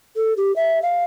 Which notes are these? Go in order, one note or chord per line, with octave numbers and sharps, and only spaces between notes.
A4
G4
E5
F5